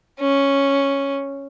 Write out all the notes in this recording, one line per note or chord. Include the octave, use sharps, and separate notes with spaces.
C#4